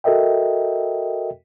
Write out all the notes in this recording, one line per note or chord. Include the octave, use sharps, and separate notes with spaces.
F#4 A4 A#4 D#5 E5 G5